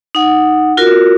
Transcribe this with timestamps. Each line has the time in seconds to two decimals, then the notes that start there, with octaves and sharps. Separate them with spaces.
0.15 D#4 F#5
0.77 F4 F#4 A#4